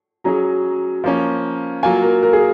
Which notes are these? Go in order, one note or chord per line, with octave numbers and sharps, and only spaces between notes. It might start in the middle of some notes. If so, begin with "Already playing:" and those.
F#3 C#4 G#4 A#5
F3 A#3 C#4
F#3 A#3 F4 G#5
A#4
A#4
G#4